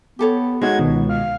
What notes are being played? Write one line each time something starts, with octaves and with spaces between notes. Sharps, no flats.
B3 G4 A4 C#5
G#3 D#4 F#4 C#5 G#6
C#2 B2 D#3
F5